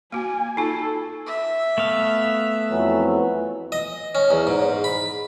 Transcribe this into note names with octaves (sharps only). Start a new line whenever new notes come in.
A#3 F#4 G#5
D#4 F4 A4
E5
A3 B3 F5
F2 E3 F#3
D#5
C#4
E2
G#2
B5